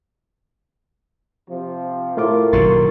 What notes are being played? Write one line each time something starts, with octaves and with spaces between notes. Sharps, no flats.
C3 F3
A2 A3 F4 A#4 D6
F#1 B2 D#3 C6 C#6 A6